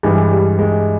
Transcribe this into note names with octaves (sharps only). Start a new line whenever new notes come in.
G2 E3 G#3
G3
G#3